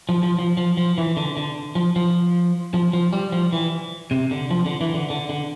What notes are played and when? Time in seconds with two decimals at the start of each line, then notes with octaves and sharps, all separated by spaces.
0.09 F3
0.23 F3
0.39 F3
0.57 F3
0.77 F3
0.98 E3
1.17 D3
1.37 D3
1.75 F3
1.96 F3
2.74 F3
2.93 F3
3.13 G3
3.32 F3
3.53 E3
4.11 C3
4.31 D3
4.51 F3
4.66 D3
4.81 E3
4.94 D3
5.10 D3
5.29 D3